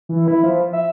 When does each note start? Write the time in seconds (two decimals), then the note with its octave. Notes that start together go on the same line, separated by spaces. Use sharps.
0.09 E3
0.28 E4
0.43 F3
0.73 E5